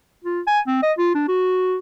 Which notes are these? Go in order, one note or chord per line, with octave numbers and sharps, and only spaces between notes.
F4
G#5
C4
D#5
F4
D4
F#4